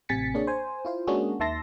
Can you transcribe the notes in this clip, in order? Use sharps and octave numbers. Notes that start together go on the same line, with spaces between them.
A1 C3 G#5 A6 B6 C#7
A#3 D4 G#4 C#5
C5 G#5
E4 F4 C5
G#3 A#3 C#4 D4 F#4 G#4
D#2 D#3 E5 A5 C6 A#6